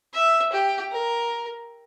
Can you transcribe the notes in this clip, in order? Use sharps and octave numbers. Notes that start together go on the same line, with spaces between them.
E5
G4
A#4